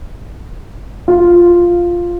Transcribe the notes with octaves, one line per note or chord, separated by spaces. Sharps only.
F4